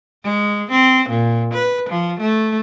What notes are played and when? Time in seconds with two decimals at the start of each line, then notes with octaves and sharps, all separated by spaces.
0.24 G#3
0.71 C4
1.09 A#2
1.54 B4
1.89 F3
2.20 A3